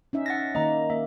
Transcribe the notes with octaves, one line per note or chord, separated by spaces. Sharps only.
C#4 D#4 E5
F#5 A6 A#6
D#3 A#3 D#5 A#5
A#3 E5